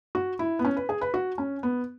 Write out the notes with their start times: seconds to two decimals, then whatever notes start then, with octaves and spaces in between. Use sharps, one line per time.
0.15 F#4
0.39 E4
0.59 B3
0.65 C#4
0.77 B4
0.89 G#4
1.01 B4
1.14 F#4
1.38 C#4
1.63 B3